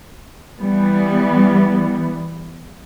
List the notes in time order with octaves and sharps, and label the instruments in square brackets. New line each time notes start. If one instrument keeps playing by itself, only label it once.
[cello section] E3 G3 B3